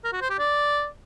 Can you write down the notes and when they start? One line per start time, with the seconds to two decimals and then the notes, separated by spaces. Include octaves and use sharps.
0.04 A#4
0.13 F#4
0.21 C5
0.30 G4
0.38 D5